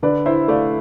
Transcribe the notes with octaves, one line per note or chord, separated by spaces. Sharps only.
D3 B4 D5
E4 C5 E5
A3 D5 F5